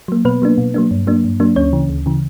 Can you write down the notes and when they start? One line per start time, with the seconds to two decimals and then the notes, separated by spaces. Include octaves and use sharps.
0.08 F#3 A#3
0.25 B2 B3 B4
0.42 F#3 A#3 D4
0.58 B2
0.74 F#3 A#3 D4
0.91 G2
1.07 F#3 A#3 D4
1.24 G2
1.40 F#3 A#3 D4
1.56 D2 C#4 C#5
1.73 C#3 E3
1.89 D2
2.06 C#3 E3